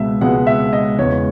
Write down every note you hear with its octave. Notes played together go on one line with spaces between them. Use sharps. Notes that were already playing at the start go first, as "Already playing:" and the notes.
Already playing: C#2 B2 G#3 B3 E5
C#2 B2 G#3 B3 F#5
E5
D#5
E2 C#3 G#3 C#5